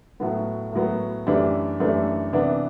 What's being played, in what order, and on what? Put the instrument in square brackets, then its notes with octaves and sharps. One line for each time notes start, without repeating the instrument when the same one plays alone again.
[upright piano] A2 F#3 B3
A2 F#3 B3
F#2 E3 A3 D4 G4
F#2 E3 A3 D4 G4
C3 E3 B3 D4